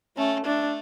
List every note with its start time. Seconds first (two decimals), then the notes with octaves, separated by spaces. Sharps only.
0.17 A3 C#4
0.45 A3 D4